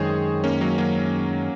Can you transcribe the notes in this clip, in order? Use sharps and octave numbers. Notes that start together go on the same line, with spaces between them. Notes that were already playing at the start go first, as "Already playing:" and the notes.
Already playing: F#2 D#3 G#3 C4 G#4 C5 C#5
A#3 C#4
F#3 A#3
F#3 A#3